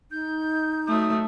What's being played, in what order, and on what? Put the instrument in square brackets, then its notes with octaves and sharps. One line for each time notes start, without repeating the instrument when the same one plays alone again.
[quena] D#4 [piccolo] G6
[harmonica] F#3 D#6 [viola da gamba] A3